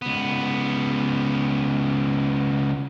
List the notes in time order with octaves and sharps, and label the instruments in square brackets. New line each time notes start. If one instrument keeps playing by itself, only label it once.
[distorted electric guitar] C#2 B3